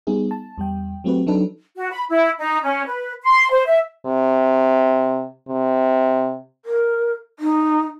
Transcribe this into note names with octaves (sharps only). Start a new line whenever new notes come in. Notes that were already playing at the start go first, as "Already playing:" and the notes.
G3 B3 D#4 G#4
A5
E2 G3 G5
F#3 A3 C4 F#4 G4 B4
F#3 D4 D#4 A4 B4
F#4
B5
E4
D#4
C#4
B4
C6
C5
E5
C3
C3
A#4
D#4